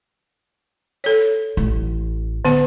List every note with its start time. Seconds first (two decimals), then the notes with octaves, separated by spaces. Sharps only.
1.04 A4 C#5
1.57 A1
2.45 D3 B3 F#5